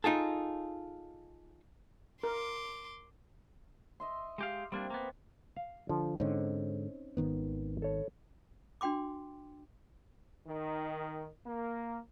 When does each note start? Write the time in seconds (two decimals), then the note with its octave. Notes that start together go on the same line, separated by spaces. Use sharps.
0.04 D#4 F4 G#4 A4
2.23 A#4 C6 D6
4.00 D#5 E5 C6
4.38 G#3 G4 F5
4.72 G3 A#3 C4 D4
4.90 A#3 B3
5.57 F5
5.89 D3 F3
6.20 G#2 D3 C4 C#4 D#4
7.17 G#1 D#3 B3
7.82 A4 C#5
8.81 D4 F#4 G5 C6 D6
10.47 D#3
11.46 A#3